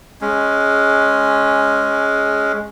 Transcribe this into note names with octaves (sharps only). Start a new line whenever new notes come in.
G#3 C#4